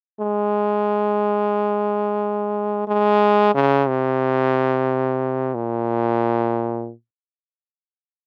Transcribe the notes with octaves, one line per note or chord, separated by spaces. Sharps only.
G#3
G#3
C#3
C3
A#2